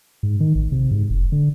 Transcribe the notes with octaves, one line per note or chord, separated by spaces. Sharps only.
G#2
D#3
A1
C3
G#2
F1
D3